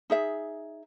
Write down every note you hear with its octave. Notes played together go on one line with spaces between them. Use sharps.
D#4 G#4 E5